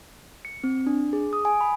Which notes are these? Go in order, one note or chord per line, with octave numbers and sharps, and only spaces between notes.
C#7
C4
D4
G#4
D#6
G#5
B5